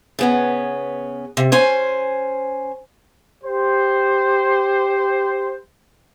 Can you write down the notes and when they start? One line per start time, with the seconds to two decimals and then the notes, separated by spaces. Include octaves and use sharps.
0.19 C#3 B3 C#4
1.37 C3
1.52 C#4 C5 G#5
3.43 G4 C5